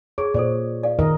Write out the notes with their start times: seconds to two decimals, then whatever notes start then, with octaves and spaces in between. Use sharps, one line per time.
0.18 G#4 C#5
0.34 A#2 A4 C5 D5
0.83 D5 F5
0.99 D#3 A#4 D#5